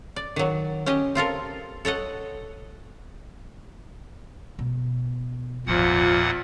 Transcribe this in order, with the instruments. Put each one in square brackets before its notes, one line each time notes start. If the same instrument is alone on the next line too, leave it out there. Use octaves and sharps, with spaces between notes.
[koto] D5
D#3 F#3
C#4 G4 D#5
C4 F4 A4 A#4
A4 C#5 D#5 F#5
[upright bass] B2
[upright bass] G#1 C#4 [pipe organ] E2 A#2 F#5 [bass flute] F3